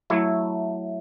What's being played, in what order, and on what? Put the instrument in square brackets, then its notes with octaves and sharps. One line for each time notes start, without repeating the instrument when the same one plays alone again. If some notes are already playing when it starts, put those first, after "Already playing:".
[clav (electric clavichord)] F#3 A3 E4